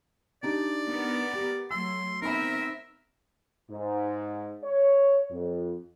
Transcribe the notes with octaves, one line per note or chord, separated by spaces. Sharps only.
D4 D#4 G4 D5
B3 A#4
G4
F#3 A3 C6 E6
B3 C4 D#4 A#4 E5 B5
G#2
C#5
F2